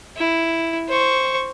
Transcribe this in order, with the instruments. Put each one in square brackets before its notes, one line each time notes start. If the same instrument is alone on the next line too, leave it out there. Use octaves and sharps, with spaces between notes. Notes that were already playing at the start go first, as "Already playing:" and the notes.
[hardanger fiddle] E4
C5 C#6